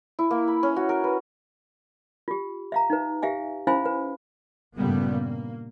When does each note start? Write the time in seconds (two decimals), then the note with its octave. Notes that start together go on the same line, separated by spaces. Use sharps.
0.19 E4
0.31 A#3
0.48 B5
0.63 C#4
0.76 F#4
0.89 A#4
1.04 B4
2.28 F4 G4
2.72 E5 F5 A#5
2.90 D#4 B4
3.22 G4 E5 F5 G#5
3.67 C#4 E4 C5 F5 G#5 B5
3.86 B4
4.76 G2 A#2 C#3 G3 A3 B3
5.13 A#3